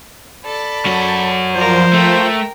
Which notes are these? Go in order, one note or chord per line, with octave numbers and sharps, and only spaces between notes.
A4 D5 B5
F#2 F#4
F3 A#4 C5 D5
A3 A#4 G5